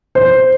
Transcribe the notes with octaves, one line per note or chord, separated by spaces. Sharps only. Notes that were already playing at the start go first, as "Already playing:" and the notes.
C5